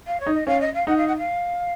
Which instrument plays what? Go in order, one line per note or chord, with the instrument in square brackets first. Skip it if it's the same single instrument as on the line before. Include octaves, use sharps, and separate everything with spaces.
[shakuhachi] F5
C#5
[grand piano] D#4
[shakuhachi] D#5
[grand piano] C#4 [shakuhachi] F5
[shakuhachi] D#5
F5
[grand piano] D#4 [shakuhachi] F#5
[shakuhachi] F5
F#5
F5